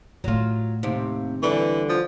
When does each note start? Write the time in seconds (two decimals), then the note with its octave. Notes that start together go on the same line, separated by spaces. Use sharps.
0.24 A2 F#3 A3 F4
0.83 D#2 C3
1.43 D3 E3 G3
1.89 F3